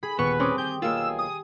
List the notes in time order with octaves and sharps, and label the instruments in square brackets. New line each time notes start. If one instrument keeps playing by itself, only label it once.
[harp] G#4 [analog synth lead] B5
[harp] D#1 [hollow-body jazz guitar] B3 [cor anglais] B4 [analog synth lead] C#6
[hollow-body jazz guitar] C4 [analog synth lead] C#4 [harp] C6 D6 D#6
[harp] G4 [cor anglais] G#4 [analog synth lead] G6
[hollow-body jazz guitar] B1 A#3 F4 [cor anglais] G#4 [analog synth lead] E6
[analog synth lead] D#6